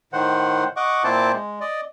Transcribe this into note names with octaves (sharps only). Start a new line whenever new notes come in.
A2 D#3 C5 F#5
D#5 F#5 C#6 D6
A#2 C4 E4 C5 A5 D6
G#3
D5 D#5